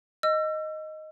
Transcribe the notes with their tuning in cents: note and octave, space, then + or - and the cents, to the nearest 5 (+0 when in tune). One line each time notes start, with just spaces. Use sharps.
D#5 +0 E6 +35